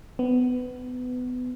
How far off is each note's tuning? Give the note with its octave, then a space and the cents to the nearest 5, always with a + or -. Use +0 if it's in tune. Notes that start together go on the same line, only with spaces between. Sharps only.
B3 +20